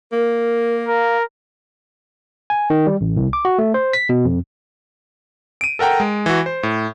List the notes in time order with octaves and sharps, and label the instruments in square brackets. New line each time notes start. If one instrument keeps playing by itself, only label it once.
[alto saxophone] A#3 [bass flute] A#4
[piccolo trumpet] A#4 [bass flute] F5
[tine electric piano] G#5
D#3
G3
A1
C2
D6
F#4
A3
C5
B6
B2
F2
[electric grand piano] D7 D#7
A4 A#4 F#5 G5 A#5
G#3
E3 F#4
C5
A2